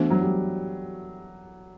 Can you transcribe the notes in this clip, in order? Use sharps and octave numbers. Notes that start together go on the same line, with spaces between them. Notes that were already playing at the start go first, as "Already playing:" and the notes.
Already playing: E3 A3 B3 D4 F#4 C5
F#3
G3